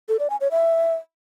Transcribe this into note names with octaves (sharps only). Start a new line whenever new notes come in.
A4
D5
G#5
C#5
E5